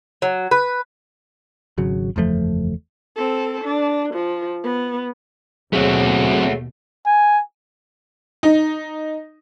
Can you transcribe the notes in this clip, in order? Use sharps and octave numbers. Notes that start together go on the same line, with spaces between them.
F#3
B4
G#1 C#3 F#3
F#1 E2 F3 A3
C4 A4
D4
F3
B3
D#2 B2 F#3 A3 C4 F#4 G#4 C#5
G#5
D#4